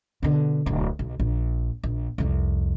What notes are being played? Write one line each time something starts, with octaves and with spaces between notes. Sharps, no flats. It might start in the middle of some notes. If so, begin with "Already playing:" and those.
B2 D3
D1 B1
B1
A#1
A#1
C2 F2